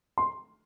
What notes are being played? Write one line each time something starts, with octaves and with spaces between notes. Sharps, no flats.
C6